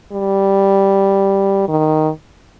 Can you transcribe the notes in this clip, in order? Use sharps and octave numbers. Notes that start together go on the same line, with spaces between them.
G3
D#3